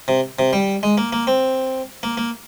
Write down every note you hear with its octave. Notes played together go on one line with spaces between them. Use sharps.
C3
C3
G3
G#3
A#3
A#3
C4
A#3
A#3